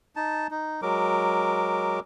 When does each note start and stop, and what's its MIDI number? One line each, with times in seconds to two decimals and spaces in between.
0.16 0.47 63
0.16 0.47 81
0.51 0.81 63
0.82 2.00 54
0.82 2.00 56
0.82 2.00 70
0.82 2.00 86